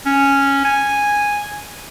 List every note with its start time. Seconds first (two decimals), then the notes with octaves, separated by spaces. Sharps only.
0.06 C#4
0.65 G#5